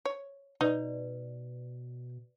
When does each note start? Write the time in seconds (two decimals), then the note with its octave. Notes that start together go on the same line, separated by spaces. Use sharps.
0.05 C#5
0.61 B2 D#4 B4 D5